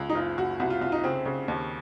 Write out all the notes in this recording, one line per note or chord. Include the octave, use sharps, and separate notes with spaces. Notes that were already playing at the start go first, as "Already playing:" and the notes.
Already playing: C#2
D#4
F#1 F4
F#1 F#4
C2 F#4
F4
C2 F4
D#4
C#3 C4
C#3
D#2